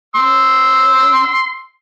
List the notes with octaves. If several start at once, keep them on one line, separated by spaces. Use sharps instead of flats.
C6 E6